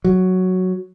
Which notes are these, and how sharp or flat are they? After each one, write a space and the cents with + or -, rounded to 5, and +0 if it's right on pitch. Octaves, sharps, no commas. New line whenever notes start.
F#3 +0